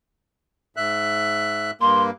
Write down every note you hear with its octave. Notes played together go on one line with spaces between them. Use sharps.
G#2 E5 F#6
G2 A#3 C6